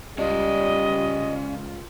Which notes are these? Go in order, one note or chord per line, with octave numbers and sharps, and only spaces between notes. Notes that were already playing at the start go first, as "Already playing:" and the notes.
C#2 G3 C#4 F4 D5 D#5